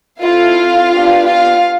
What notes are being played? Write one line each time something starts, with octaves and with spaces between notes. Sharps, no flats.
C4 E4 F4 A4 F5
B3 D4 G4
F4 F5